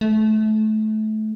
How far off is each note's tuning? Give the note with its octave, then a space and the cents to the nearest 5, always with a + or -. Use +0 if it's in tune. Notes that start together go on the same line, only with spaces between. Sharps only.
A3 -25